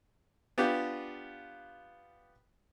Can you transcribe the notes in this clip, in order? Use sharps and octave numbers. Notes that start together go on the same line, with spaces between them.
B3 D4 F4 G4